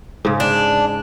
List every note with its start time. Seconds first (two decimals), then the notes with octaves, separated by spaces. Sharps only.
0.25 G#2 C#3
0.40 D4